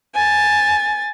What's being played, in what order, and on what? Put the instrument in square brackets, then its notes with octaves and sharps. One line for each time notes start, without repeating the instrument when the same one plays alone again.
[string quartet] G#5 A6